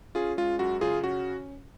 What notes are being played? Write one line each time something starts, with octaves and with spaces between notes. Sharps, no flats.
C#4 F4 G#4
G#3 F4
F#2 F#4
C#3 F4 G#4
C#4 F#4